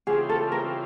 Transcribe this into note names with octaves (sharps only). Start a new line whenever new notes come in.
C#3 E3 G3 C4 F4 G#4
A4
A#4